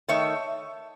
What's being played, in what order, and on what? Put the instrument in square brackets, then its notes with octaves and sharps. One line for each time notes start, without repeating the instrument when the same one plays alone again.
[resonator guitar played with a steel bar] D#3 A3 C#5 E5